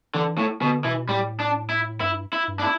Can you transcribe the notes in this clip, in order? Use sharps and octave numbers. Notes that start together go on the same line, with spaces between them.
D3 E3
A2
B2 D3
B2 E3
A2 G3
D4
E4
G2 E4
E4
G2
D4
E4